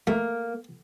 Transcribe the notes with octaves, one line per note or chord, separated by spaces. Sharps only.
A3 A#3